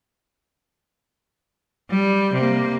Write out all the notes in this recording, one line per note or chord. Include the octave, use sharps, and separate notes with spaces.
G3
C3 A#3